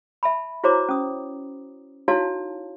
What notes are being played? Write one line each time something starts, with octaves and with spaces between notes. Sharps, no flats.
E5 A5 B5
E4 F#4 C5 C#5 A#5 D6
C#4 D#6
D#4 E4 F#4 C#5 F5 A5